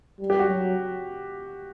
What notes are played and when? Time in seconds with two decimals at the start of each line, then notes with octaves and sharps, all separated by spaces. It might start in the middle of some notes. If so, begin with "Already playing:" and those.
0.20 G3
0.30 G4
0.39 F#4
0.48 F#3